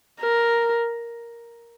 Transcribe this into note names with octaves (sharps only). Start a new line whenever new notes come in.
A#4